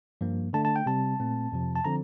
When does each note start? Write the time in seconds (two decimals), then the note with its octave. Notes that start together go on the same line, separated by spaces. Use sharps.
0.21 G2 F3 A#3
0.53 D3 A3 D4 A5
0.65 A5
0.76 G5
0.86 C3 G3 C4 A5
1.20 A#2 A3 C4
1.52 F2 C3 F3
1.76 A5
1.85 D3 F3 C4 A#5